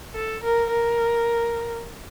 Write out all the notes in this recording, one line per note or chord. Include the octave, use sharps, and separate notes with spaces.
A4
A#4
A#4